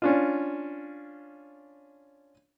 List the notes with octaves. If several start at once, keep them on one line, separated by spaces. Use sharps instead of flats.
C#4 D4 F4